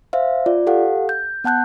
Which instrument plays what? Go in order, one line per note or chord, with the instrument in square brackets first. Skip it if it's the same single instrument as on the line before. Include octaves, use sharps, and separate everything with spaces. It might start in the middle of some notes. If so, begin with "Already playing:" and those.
[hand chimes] C5 E5 F5
F4 D5
G4 A4 F5 F#5
G6
B3 F#5 A5 F#6 G6